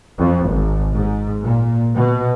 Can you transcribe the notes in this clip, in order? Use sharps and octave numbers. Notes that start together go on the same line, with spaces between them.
F2
G#1
G#2
A#2
B2